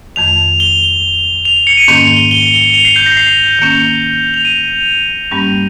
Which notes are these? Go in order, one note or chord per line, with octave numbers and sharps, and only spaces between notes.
F2 D#3 G#3 F7
G7
F7
F7
C#7
D#7
G#2 D#3 A#3 C#4 F7
F7
G7
G7
F7
C7
G6
C7
A#6
C7
D#3 A#3 C#4
F7
D#7
G2 G3 A#3 C#4